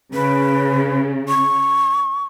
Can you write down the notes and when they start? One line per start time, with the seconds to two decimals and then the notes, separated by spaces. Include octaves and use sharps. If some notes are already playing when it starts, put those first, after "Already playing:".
0.14 C#3 B4
1.29 C#6